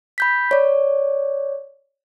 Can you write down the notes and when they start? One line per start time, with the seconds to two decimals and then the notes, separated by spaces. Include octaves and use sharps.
0.18 B5 G6 B6
0.51 C#5 D5